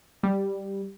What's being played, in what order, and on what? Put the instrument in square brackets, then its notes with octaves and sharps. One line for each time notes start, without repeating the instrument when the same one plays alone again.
[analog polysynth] G3